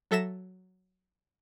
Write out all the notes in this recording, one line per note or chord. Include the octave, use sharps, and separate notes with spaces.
F#3 A4 E5 A#6 E7